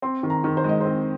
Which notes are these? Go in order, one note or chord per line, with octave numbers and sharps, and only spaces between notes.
C4 C6
D#3
A#5
D#3
C5
G#3 D#5
C4 C5